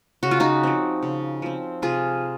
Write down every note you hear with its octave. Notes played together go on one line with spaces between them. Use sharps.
C#3 F#4
F4
D#4 F#4
F3 C4
C#3
F3 C4
C3 F4 G#4